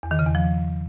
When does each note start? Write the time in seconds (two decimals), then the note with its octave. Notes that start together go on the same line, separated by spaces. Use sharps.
0.03 E2
0.11 D#3
0.19 C#3
0.27 E2
0.35 F3